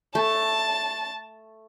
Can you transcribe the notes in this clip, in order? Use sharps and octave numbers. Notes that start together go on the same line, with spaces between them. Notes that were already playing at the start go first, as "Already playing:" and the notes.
A3 A5